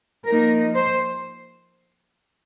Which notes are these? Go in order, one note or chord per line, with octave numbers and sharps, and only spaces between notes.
F3 A#3 D#4 A#4
C5